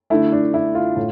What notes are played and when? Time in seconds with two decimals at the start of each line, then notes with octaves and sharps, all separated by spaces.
0.10 D3 A3 E4
0.32 D4
0.54 E4
0.75 F4
0.96 A2